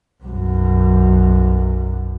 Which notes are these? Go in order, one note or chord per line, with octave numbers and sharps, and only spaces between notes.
B1 F#2